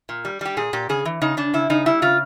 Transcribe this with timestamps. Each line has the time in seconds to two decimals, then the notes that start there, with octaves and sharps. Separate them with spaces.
0.09 A#2
0.25 G3
0.41 G3 G4
0.57 A#2 G#4
0.73 A#2 G4
0.89 C#3 G#4
1.05 E3
1.22 C#3 D#4
1.37 C#3 D4
1.54 C#3 E4
1.70 C#3 D#4
1.86 G3 E4
2.02 C#3 F4